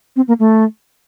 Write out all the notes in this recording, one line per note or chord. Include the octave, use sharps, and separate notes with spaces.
C4
A#3
A3